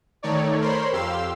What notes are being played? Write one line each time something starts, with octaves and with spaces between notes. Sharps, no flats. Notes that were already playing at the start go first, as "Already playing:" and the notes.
D#3 A3 D#4 C#5 D5
A#4 C5 C#5 B5 C6
F2 G4 F5 C6 E6